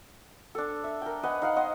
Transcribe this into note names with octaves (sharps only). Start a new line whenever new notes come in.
D4 A4
E5
A#4 G5
B4 D#5 F#5 G#5
D#4 F5 F#5
D#5 F#5 C6